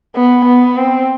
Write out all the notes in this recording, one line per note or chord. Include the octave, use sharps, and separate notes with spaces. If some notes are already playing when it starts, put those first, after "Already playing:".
B3
B3
C4